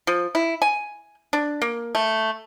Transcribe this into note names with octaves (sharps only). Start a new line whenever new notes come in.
F3
E4
G#5
D4
A#3
A3